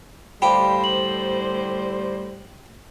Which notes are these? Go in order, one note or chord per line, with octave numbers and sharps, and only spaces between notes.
A2 D3 G3 G4 C5 F5 A5 B5
F#7